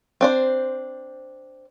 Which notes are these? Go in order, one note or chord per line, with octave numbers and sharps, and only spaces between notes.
C4 D4 C5